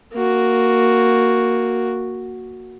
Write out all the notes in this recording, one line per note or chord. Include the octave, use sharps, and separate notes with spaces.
A#3 F#4